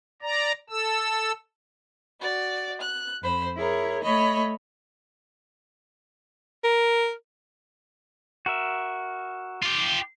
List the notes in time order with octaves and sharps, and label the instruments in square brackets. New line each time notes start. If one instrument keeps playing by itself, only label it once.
[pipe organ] D5 A#5
A4 E6
[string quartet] F#4 D5
F#6
F2 C5 B5
E4 G#4 A#4 C#5
A3 C#5 D#5 B5
[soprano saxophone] A#4
[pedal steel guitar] F#4 A#4 E5
[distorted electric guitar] F4 G4